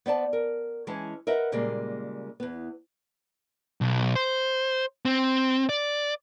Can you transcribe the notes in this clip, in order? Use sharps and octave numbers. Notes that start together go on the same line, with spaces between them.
B3 C5 D5 A5
A#4
E3 G#3 C#4 A5
A#4 B4 D#5 E5 F#5
A#2 C#3 G3 G#3 A#3
E2 B3
B1
C5
C4
D5